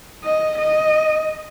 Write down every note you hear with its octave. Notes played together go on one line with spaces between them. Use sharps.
D#5
D#5